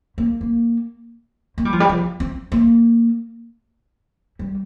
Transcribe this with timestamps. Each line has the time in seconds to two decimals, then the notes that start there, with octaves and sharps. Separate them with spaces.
0.18 A#3
0.41 A#3
1.58 A#3
1.65 G3
1.73 F3
1.80 G3
1.89 F3
2.20 C4
2.52 A#3
4.39 G3